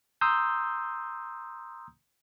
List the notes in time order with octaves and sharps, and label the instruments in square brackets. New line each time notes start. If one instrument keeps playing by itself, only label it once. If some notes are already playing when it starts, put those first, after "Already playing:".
[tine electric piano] A#5 C6 D#6 E6 G6